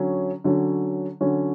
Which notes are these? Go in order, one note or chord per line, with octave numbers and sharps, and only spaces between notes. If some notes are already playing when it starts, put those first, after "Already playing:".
Already playing: D3 F#3 C#4
D3 F#3 C#4
D3 F#3 C#4